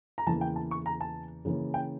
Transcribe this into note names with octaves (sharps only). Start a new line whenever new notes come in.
A#5
E2 C#3 E3 A#3 A5
G5
A5
C#6
A#5
A5
C#3 E3 A#3 C#4
G5